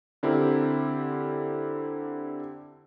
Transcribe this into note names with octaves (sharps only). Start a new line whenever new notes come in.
D3 C4 E4 G4 A#4